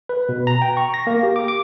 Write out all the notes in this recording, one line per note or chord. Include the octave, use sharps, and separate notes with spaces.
B4
B2
A#5
G5
C#6
A#6
A#3
G4
D6
D6